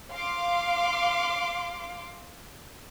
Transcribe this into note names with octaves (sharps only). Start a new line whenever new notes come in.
F5 C6 D6